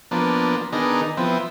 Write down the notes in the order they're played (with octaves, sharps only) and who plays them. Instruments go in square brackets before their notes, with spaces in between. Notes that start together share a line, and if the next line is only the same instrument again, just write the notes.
[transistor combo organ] F3 A#3 B3 D4
D#3 B3 D4 D#4 G#4 A#4
F3 B3 C4 E4